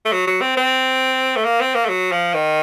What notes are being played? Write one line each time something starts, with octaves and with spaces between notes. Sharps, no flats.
A3
F#3
F#3
C4
C4
A3
A#3
C4
A#3
A3
F#3
F3
D#3